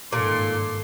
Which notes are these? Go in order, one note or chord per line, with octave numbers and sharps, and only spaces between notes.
G#1 G2 A#2 D#3 A4 C6 D6